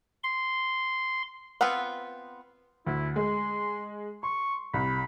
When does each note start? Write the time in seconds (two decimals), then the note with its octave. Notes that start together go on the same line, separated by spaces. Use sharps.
0.23 C6
1.61 B3 C4 F4 B4 F#5
2.87 D2 E4
3.16 G#3 C6
4.23 C6 C#6
4.74 C2 B5